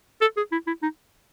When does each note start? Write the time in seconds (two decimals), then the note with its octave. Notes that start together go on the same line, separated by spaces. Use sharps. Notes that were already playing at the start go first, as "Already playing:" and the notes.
0.21 A4
0.37 G#4
0.52 E4
0.67 E4
0.82 D#4